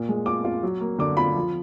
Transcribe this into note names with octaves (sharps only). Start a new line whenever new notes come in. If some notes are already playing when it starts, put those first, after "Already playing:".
Already playing: A#2
G#3
F4 D6
F4
F#3
A#3
D3 D6
F4 B5
F3